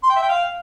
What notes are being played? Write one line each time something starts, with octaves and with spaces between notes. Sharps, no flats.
C6
G5
E5
G5
F5